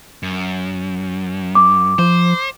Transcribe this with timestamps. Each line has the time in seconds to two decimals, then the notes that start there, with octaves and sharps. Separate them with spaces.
0.23 F#2
1.55 D6
1.99 F3 C5